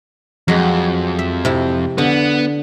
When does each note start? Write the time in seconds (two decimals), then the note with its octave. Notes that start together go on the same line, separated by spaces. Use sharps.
0.48 F2 F#3 G#3
1.19 E5
1.45 C3 E4
1.98 D3 B3